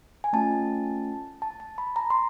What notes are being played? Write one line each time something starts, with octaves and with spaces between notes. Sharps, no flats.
G#5
A3 C#4 F4 A5
A5
A5
B5
A#5
C6